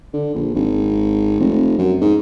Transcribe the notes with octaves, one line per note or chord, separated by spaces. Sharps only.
D3
A#1
G#1
F1
F#2
G#2